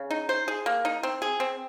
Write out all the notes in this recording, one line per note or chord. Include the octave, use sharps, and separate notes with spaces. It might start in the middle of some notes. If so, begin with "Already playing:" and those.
Already playing: C#3
D#4
C5
G#4
A#3
D#4
C4
G#4
C4